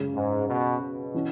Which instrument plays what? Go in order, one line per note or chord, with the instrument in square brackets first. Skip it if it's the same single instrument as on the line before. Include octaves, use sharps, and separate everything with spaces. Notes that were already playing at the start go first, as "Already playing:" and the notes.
Already playing: [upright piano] F#2 C#3 G#3 C#4
[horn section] G#2
B2
B2
[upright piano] E3 C#4